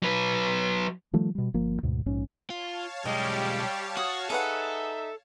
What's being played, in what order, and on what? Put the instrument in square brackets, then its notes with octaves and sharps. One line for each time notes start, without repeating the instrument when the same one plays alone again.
[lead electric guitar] F#3 B4
[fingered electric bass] D#3 F3 G3 A3
B2 G3
G1 F3 A#3
D2 G#2 B2
A#1 G#2 C#4
[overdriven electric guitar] F4 [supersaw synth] C#5 F5 A5
[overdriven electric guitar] B1 G#3 [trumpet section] G3 G4 [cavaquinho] D#5
[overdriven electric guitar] F#4 [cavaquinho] D#6
[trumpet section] D#4 E5 [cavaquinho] G#4 B4 F#5 [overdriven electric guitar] A4